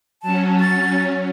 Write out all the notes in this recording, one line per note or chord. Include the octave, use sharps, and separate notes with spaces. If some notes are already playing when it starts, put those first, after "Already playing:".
F#3 C#4 A5
A6